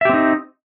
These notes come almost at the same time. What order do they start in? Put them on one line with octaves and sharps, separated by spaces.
E5 G4 C4 D#4